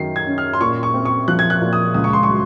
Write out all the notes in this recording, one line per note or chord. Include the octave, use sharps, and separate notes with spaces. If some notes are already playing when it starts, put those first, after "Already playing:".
Already playing: F#2 D#3 F#3 C7
G#6
C#4
F6
C6
A#2 C#6
C#6
C4
C#6
F3 F#6
G#6
F#6
A#2
D#6
C#2 D#6
C#6
C6
C#6
F#3